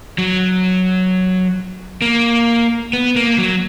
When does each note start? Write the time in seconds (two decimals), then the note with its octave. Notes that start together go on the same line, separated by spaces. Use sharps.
0.18 F#3
2.02 A#3
2.93 B3
3.16 A#3
3.38 F#3